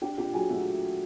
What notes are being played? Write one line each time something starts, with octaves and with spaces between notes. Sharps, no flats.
D4 G4 G5
A#2 G4 G5
F#3 G#4 G#5
A3 F#4 F#5